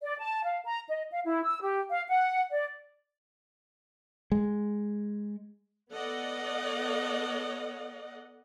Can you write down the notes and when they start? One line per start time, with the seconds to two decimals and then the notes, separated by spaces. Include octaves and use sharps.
0.02 D5
0.19 A5
0.43 F5
0.65 A#5
0.89 D#5
1.11 F5
1.25 E4
1.43 E6
1.62 G4
1.90 F5
2.09 F#5
2.52 D5
4.32 G#3
5.92 B3 A4 D5 D#5 F#5